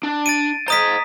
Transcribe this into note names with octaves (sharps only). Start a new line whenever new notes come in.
D4
A6 D7 D#7
C5 D#5 A#5 D#6 B6